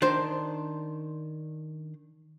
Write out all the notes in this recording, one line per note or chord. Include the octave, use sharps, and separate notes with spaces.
D#3 D4 C5